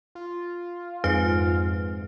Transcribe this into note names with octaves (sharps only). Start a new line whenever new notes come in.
F4
F2 G#2 B4 F6